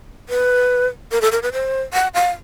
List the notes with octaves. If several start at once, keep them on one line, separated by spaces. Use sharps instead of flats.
B4
A#4
A4
A#4
B4
C5
F#5
F5